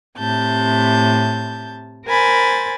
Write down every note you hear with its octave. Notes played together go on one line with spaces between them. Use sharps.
A2 C3 A5 G6
A#4 C5 G#5 B5 A6